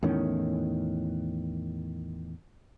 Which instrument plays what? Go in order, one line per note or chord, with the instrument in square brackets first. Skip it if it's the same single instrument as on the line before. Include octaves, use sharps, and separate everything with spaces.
[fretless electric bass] E2 A2 D#3 C#4